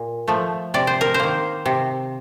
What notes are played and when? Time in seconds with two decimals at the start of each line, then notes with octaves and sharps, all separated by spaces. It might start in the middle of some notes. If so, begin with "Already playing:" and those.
Already playing: A#2
0.28 F3 A3
0.74 C3 D5
0.87 C5
1.01 A#4
1.14 C5
1.19 D#3 A#3
1.66 C3